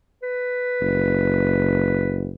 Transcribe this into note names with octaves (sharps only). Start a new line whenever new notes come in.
B4
F#1